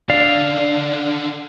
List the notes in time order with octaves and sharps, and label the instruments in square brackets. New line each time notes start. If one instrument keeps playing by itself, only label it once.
[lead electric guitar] D3 D4 [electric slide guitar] D5 [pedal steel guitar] F5